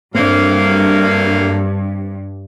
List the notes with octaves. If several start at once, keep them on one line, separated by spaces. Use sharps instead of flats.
G2 F#3 A3 A#3 C4 D4